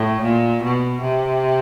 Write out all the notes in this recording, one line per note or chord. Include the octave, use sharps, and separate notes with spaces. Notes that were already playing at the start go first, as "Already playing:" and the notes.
Already playing: A2
A#2
B2
C3